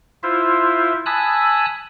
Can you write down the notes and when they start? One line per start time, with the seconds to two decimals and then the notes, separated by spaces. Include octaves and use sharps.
0.23 E4 F4 C5 E5
1.06 G#5 A5 B5 D#6 E6 F#6